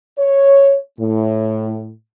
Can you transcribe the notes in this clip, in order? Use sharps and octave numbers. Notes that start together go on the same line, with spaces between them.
C#5
A2